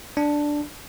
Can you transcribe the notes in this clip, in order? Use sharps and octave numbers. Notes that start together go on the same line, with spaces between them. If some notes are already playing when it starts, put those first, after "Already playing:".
D4